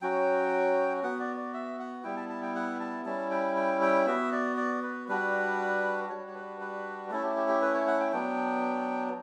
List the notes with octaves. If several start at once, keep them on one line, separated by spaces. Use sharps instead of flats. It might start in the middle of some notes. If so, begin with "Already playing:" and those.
F#3 C#4 F#4 G5
B3 F#4 F#5
D5
D5
E5
F#5
G3 B3 E4 G5
A5
A5
G5
F#5
A5
G3 C#4 E4 A5
G5
G5
G5
B3 F#4 E5
D5
D5
B4
G3 D4 F#4 B4
G3 D4 F#4 C#5
C#5
B4
B4
A3 C#4 E4 A4
G4
G4
G4
B4
C#5
F#5
G5
F#3 B3 D4 G5